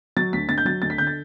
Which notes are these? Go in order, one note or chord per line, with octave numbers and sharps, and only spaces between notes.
F#3 A6
D2 B6
D2 A6
G6
F#3 A6
D2 A6
B6
D3 G6
A6